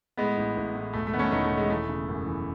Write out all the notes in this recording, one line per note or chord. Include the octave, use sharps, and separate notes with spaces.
A2 G#3 B3
A1
A1
A2
E1 A3
A3
D#3 B3
A3 C#4
E1 B3 D#4
A3
E1
G#3
E3 A3
C#3
F#2
E3